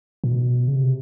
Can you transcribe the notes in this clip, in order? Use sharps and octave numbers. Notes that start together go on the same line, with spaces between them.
A#2
B2
C#3
C3